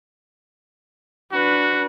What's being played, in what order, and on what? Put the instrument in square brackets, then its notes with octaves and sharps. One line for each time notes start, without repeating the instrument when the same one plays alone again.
[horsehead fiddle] D4 B4 [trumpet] F#4